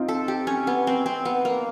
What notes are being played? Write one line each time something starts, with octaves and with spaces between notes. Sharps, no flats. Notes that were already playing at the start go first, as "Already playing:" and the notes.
Already playing: C4 D#4 F4
A4
G4
C#4
B3
C4
C4
B3
A#3